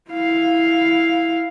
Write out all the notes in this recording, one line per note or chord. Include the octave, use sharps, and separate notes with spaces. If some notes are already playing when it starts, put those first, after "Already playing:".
E4 F5